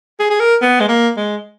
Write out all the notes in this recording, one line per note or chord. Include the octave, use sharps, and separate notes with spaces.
G#4
G#4
A#4
B3
G#3
A#3
G#3